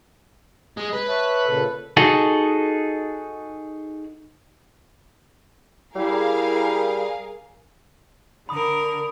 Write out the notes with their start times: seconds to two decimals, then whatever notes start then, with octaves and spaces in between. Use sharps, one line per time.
0.77 G#3
0.93 B4
1.08 C#5 E5 A5
1.46 A#2 C#3 A4
1.97 D#4 F#4 G#4 A4
5.96 G3 E4 G#4 A#4 F5
8.49 D3 A#4 B5 D#6